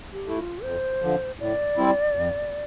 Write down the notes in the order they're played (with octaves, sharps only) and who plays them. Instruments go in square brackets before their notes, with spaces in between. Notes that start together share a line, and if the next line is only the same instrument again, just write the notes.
[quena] G4
[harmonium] A3 E4
[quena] F4
[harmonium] F2 [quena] C5
[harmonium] D3 F3
[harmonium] A2 [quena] D5
[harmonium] G3 C4 E4
F2